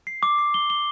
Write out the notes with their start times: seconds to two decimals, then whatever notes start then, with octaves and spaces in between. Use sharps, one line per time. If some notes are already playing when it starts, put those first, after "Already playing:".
0.07 C7
0.23 D6
0.38 C7
0.54 G7
0.70 G7